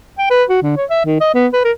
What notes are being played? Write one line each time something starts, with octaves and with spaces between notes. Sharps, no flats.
G5
B4
F#4
D3
C#5
E5
D#3
D#5
B3
B4
A#4